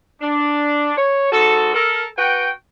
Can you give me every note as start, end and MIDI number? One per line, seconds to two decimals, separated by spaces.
0.21 0.93 62
0.96 1.30 73
1.32 1.71 44
1.32 1.71 66
1.32 1.71 69
1.74 2.05 69
1.74 2.05 70
2.17 2.49 66
2.17 2.49 71
2.17 2.49 78
2.17 2.49 79